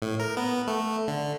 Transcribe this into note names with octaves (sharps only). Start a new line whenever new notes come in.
A2
A#4
B3
A3
D3